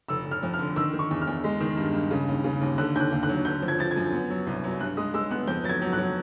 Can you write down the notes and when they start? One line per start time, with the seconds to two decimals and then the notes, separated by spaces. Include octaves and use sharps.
0.09 F1 E6
0.25 F1
0.31 F6
0.43 F2
0.54 F6
0.59 D3
0.76 D#3 E6
0.93 D#3
0.99 C#6
1.11 E2
1.22 F6
1.27 E2
1.44 G#3
1.60 D#3
1.77 G2
1.94 G2
2.11 C#3
2.28 D#2
2.44 C#3
2.61 D#2
2.78 D3 F#6
2.95 D#2 G6
3.00 F#6
3.12 D#2
3.23 F#6
3.29 F#3
3.45 D3 G6
3.62 F3
3.68 G#6
3.79 F3 A6
3.91 G#6
3.96 F#2
4.13 B3
4.30 F#3
4.47 C2
4.64 F#3
4.80 G2 F#6
4.97 G#3 D#6
5.14 G#3 E6
5.31 B3 F#6
5.47 F2 G6
5.64 F#3 A6
5.69 G#6
5.82 F#3
5.93 F#3 F#6